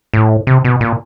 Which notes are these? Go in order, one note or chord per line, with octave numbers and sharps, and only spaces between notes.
A2
C3
B2
A#2